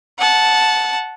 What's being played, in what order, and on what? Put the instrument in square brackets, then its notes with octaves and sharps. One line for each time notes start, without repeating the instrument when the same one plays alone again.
[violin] F#5 A5